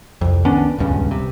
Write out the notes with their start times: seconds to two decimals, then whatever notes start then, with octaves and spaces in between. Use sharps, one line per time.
0.21 C2 F2
0.45 D#3 B3 C#4 D4
0.78 D#1 C#2 G2 C#3
1.11 C3